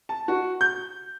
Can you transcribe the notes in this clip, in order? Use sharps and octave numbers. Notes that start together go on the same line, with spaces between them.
A5
F#4
G6